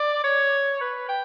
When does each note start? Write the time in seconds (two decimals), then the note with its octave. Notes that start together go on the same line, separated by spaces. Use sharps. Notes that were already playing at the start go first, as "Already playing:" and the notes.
Already playing: D5
0.24 C#5
0.81 B4
1.09 G5